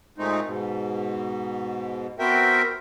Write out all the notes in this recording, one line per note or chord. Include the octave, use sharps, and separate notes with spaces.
A#2 G#3 A3 C4 D#4
G#2 B2
B3 C4 F#4 A#4 E5 G5